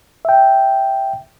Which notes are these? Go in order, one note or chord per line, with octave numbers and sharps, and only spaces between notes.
E5 G5